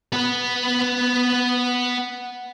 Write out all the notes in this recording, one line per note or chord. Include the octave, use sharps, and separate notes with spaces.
B3 B4